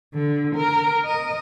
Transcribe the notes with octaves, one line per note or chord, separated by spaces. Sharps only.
D3
A#4
D#5